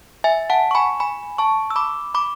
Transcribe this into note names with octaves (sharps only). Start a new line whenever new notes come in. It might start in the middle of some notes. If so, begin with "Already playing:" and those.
E5 G#5
F#5 A5
C#6
G#5 B5
G#5 B5
A5 C#6
E6
B5 D6
B5 D6